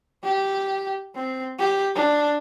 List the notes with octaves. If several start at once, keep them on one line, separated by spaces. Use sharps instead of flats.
G4
C4
G4
D4